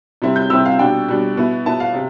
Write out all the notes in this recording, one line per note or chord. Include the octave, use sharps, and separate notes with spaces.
C3 G3 C4 E4
G6
C3 G3 C4 E4 E6
F5
B2 G3 D4 G5
B2 G3 D4
B2 B3 E4
B2 B3 E4 A5
F5
C3